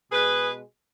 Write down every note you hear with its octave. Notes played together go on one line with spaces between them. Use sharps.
B2 G#3 G#4 B4